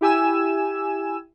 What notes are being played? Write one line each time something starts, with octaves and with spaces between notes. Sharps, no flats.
E4 G4 G#5 E6 E7